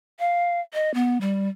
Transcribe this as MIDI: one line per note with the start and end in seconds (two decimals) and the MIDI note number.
0.20 0.61 77
0.73 0.93 75
0.94 1.18 59
1.21 1.48 55